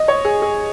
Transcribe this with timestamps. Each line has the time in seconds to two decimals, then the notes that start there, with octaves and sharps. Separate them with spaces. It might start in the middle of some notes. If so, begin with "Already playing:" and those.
Already playing: D#5
0.08 C#5
0.25 G#4
0.42 G#4